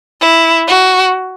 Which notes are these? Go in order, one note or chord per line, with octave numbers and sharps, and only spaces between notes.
E4
F#4